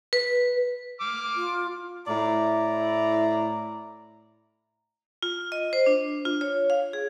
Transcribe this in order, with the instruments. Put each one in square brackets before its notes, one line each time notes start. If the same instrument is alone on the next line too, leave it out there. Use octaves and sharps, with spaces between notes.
[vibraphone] B4
[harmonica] D6 F6
[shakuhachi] F4
[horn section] A2 E4 D5 A#5
[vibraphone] F4
D#5
C5
D4
F4
C#5
F5
G#4